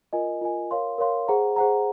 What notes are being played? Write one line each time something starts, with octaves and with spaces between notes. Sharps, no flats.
F4 A#4 D#5 G#5
F4 A#4 D#5 G#5
A#4 C#5 F5 C6
A#4 C#5 F5 C6
G#4 C5 F#5 A#5
G#4 C5 F#5 A#5